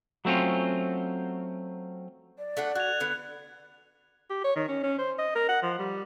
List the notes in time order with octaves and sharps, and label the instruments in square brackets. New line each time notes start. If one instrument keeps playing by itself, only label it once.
[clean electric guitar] F#3 A3 C4 C#4 F4
[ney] D5
[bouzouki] A3 D4 F#5
[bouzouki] F#4 [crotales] F#6 G#6 F7
[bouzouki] D3 B3
[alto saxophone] G4
C#5
D#3
C#4
C#4
C5
D#5
A#4
F#5
F3
G3